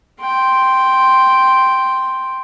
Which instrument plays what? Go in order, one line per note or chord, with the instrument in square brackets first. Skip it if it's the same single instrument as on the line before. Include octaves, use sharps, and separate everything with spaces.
[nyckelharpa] G5 C6